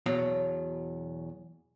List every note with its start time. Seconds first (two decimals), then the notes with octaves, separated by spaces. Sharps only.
0.06 E2 B2 F#3 F5